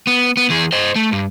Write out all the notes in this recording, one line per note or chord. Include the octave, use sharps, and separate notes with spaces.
B3
B3
E3 G#4
C5 D#5
A3
G2